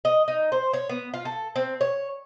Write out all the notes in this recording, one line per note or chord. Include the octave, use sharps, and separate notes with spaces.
D#5
D#4
C5
C#5
B3
F4
A4
C4
C#5